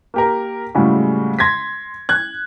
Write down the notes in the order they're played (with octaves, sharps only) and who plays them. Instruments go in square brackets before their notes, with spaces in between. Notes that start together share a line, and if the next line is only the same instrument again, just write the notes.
[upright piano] A#3 G4 A#4
A2 C#3 G3 G#3 F#4
C6 G#6 A#6 B6
F#6 G#6